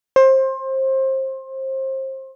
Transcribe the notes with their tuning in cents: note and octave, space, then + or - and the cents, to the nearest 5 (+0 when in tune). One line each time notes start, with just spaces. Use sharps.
C5 +25